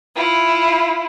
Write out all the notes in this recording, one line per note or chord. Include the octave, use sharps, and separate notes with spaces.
E4 F4